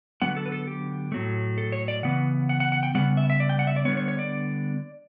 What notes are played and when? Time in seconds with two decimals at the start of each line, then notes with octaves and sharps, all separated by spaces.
0.22 D3 F#3 B3 F#5
0.37 A4
0.46 B4
0.52 A4
0.67 G4
1.12 A2 F#3 A3
1.58 A4
1.72 C#5
1.88 D5
2.03 C#3 E3 B3 F#5
2.49 F#5
2.60 F#5
2.72 F#5
2.83 G5
2.95 C#3 G3 B3 F#5
3.17 E5
3.30 E5
3.40 D5
3.49 G5
3.59 F#5
3.67 E5
3.76 D5
3.85 D3 G3 B3 C#5
3.97 C#5
4.08 C#5
4.19 D5